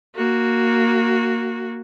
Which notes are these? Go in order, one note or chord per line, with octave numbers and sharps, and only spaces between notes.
A#3 F#4